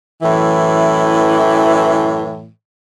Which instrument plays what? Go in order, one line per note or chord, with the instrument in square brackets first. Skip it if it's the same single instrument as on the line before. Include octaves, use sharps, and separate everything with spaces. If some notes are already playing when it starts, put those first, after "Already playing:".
[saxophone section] F#2 A2 E3